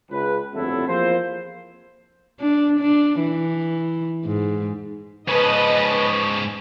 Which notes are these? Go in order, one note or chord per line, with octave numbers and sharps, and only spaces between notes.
C#2 B4
G1 F2 A2 F#3 E4 A4
E2 F3 A#3 C4 C5
D4
D4
E3
G#2
G#2 C#4 B4 D#5 A5